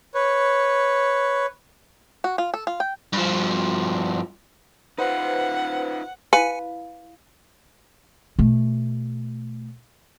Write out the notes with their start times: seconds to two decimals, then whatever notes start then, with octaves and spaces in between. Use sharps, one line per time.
0.15 B4 C#5
2.24 F#4
2.38 F4
2.54 A4
2.67 F4
2.80 G5
3.13 G2 F3
4.98 D#4 F4 B4 C5 F#5
6.33 E4 B4 F5 G#5 C#7
8.39 B2 A3